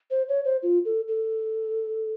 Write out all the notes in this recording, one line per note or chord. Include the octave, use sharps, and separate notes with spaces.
C5
C#5
C5
F4
A4
A4